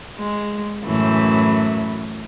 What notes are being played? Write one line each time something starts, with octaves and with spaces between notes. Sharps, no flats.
G#3
F#2 A2 E3